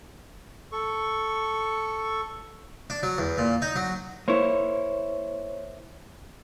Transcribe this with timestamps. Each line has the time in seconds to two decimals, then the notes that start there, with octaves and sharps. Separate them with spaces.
0.72 A4 C#6
2.90 D4
3.03 F#3
3.18 E2
3.38 A#2
3.62 D#4
3.76 F#3
4.28 A#3 E4 C5 C#5